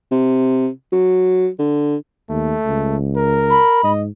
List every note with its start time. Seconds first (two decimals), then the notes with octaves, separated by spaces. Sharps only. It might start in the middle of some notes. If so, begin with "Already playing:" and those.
0.11 C3
0.92 F#3
1.59 D3
2.30 D#2 A3
2.66 C#2
3.16 A#4
3.50 B5
3.84 G#2 D#5